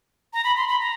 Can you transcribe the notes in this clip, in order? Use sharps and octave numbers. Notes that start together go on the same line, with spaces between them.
A#5
B5
C6
B5
A#5